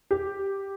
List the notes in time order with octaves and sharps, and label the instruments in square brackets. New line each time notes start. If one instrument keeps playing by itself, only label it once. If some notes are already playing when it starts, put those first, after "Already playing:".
[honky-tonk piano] G4